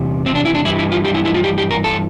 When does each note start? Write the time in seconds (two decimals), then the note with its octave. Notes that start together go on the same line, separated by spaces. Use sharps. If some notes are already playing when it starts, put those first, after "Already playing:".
Already playing: E2 C3 G3
0.26 C4
0.35 D4
0.45 E4
0.55 D4
0.65 G2 E3 G3 E4
0.79 E4
0.92 F4
1.05 G4
1.14 E4
1.25 E4
1.34 F4
1.44 G4
1.58 G4
1.71 A#4
1.84 A4